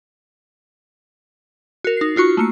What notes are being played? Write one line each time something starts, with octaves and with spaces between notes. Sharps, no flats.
F#4 A#4
D#4 C7
D#4 F4 F#4 C#6
A3 A#3 C#7